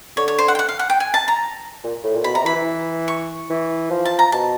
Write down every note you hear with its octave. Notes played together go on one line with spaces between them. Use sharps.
D3 C#5
C#5
C5
F#5
G5
F#5
F5
F#5
G5
G#5
A5
A#5
A#2
A2
A#2
B2 B5
C3 A#5
E3 B5
E3
C#6
E3
F3
A5
A#5
B2 A5